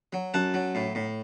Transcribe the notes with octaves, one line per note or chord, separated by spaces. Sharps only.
F#3
F#2 F#5 A5
F#3
A2
A2